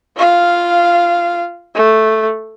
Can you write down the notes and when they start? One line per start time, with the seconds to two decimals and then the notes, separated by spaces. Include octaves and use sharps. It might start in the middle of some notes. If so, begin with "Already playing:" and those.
0.17 F4 F5
1.75 A3